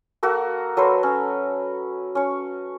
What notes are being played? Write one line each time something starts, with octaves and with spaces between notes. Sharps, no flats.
A#3 F#4 A4 A#4
F#3 A4 B4 C5
C#4
C#4 C#5